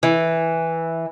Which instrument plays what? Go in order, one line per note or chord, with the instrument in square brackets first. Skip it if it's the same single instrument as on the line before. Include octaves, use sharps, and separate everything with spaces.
[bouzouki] E3